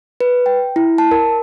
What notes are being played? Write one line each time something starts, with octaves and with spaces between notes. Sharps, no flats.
B4
G5
E4
A5
A#4